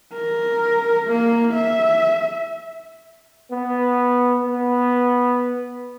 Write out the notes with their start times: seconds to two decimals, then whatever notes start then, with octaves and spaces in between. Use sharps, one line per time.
0.13 A#4
1.08 A#3
1.54 E5
3.51 B3
4.46 B3